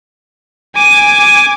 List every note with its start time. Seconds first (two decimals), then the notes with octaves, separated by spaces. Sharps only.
0.76 G#5 D6 D#7